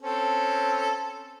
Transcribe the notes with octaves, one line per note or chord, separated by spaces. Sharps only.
C4 C#4 A4